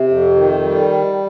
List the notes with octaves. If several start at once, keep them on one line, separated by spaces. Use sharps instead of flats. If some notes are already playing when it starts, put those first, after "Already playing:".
Already playing: C3
F2
D#3
G3